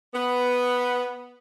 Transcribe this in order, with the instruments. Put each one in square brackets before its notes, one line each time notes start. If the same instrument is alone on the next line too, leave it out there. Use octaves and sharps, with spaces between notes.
[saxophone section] B3